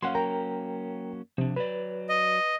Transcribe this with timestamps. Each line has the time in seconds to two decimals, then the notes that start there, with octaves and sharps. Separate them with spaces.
0.02 F#3 A#3 C#4 F5 F#5 C6
0.15 A#4 G5 A#5
1.38 C3 F3 D4
1.56 F#3 B4 D5
2.09 D#5